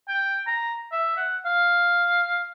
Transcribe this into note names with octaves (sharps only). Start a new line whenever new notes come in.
G5
A#5
E5
F#5
F5